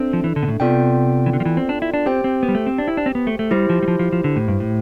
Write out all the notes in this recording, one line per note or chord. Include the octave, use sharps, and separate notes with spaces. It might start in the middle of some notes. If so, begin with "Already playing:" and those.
Already playing: C4 D4 A4 E5
F3
E3
D3
B2
A2
C3 B3 F4 A4 D5 G5
E3
D3
F3
E3
C4
D4
E4
D4
C4 G4 C5 G5
C4
B3
G3
A3
C4
D4
E4
D4
C4
B3
A3
A3
G3 E4 G4 C5
F3
G3
F3
F3
F3
D3
A2
G2
A2